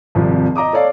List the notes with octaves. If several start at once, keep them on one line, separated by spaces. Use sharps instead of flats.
G#1 C3 F3 G3
D#5 A#5 D6 D#6
A4 C#5 D5 F5